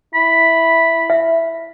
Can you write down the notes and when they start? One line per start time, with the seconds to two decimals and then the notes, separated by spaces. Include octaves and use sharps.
0.15 E4 B5
1.10 E5